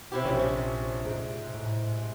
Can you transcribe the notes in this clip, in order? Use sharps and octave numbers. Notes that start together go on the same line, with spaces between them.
C3 E4 G4
A#1 A#2 C#4
C3
G#2 G#3
A2